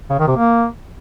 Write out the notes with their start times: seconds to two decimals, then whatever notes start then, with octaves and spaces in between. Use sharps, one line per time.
0.10 C#3
0.19 D#3
0.27 C3
0.36 A#3